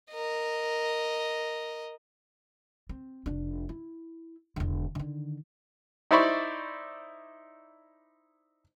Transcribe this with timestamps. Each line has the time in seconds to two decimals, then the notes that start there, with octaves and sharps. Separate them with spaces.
0.11 A#4 D#5
2.89 C4
3.26 F1 D4
3.69 E4
4.56 E1 D3
4.95 D3 D#3
6.11 D#4 E4 C5 D5 B5 C#6